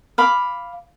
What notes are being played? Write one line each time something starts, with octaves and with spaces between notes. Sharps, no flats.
F5 B5 D6